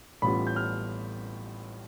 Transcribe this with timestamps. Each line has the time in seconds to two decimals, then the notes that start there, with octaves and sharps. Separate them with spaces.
0.22 A1 A2 G3 B3 F4 B5
0.47 G6
0.56 F6